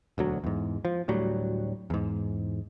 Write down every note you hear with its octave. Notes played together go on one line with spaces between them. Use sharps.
E1 D2 F#3
E2 G#2
F3
D2 A2 F#3 G3
E2 G#2